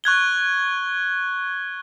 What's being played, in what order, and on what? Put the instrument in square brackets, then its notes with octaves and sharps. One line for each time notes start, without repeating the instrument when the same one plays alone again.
[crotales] C#6 F#6 G#6 G7